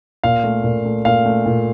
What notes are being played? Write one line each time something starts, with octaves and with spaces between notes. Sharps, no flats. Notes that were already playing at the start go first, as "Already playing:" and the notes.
A#2 F5
A3
A#2
A3
A#2 F5
A3
A#2